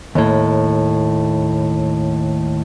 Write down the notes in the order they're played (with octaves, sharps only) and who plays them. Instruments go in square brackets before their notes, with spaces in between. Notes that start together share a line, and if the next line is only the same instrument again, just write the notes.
[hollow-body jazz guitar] D#2 A2